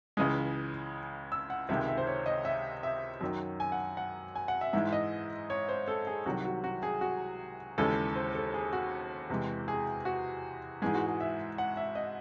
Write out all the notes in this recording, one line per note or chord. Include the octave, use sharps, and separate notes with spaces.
C#2 C#3 E3 G#3 D#6
E6
F#5
C#2 C3 D#3 G#3 E5
E5
C5
C#5
D#5
E5
E5
F#2 D#3 F#3
G#5
F#5
F#5
G#5
F#5
E5
G#2 E3 G#3 E5
D#5
C#5
C5
A4
G#4
C2 C3 D#3 F#3 F#4
F#4
F#4
G#4
F#4
D#2 C#3 E3 G#3 A4
C5
A4
G#4
F#4
E2 C3 E3 G#3
G#4
F#4
G#2 E3 G#3 G#4
F#4
G#4
E5
F#5
E5
D#5